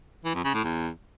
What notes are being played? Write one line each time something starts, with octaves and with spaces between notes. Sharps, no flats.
E3
F2
C#3
A2
E2